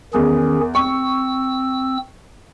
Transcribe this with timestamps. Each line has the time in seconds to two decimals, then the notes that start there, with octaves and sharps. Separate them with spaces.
0.14 E2 D#3 C#4 G#4
0.75 C4 C#6 E6